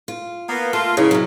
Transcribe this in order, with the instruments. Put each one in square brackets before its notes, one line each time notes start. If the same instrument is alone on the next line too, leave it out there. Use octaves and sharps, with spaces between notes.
[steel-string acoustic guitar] F4
[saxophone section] A#3 B3
[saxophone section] A3 A#3 F4 [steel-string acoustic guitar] A4
[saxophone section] G#2 C#3 [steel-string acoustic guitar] E3
[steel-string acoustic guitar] C3 F#3